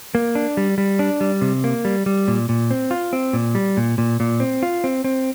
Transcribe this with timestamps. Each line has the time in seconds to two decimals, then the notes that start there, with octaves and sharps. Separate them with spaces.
0.15 A#3
0.35 D4
0.57 G3
0.78 G3
0.99 D4
1.21 G3
1.41 C3
1.64 A#3
1.85 G3
2.06 G3
2.28 A#2
2.49 A#2
2.71 C4
2.91 F4
3.13 C4
3.33 A#2
3.55 G3
3.77 A#2
3.98 A#2
4.20 A#2
4.40 C4
4.63 F4
4.84 C4
5.04 C4